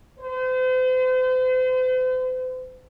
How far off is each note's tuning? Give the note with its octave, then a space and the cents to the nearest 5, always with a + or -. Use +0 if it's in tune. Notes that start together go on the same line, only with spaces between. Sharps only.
C5 -40